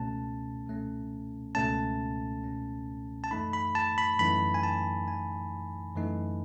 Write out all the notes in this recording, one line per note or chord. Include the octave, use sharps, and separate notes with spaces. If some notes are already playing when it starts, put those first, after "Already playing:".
Already playing: C#2 B2 A3 C#4 A5
C#2 B2 A3 C#4
C#2 B2 A3 C#4 A5
C#2 B2 A3 C#4
A5
F#2 E3 A3 D#4 B5
B5
A5
B5
F#2 E3 A3 D#4 B5
G#5
A5
F#2 E3 A3 D#4 G#5
F#2 E3 A3 D#4